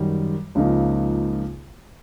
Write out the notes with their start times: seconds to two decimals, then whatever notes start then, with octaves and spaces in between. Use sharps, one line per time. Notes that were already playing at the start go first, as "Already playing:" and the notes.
Already playing: F#2 D#3 G3
0.55 C#2 C#3 F3 A#3 D#4